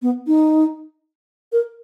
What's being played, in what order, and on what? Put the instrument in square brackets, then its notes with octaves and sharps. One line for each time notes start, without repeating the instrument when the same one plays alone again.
[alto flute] B3
D#4
A#4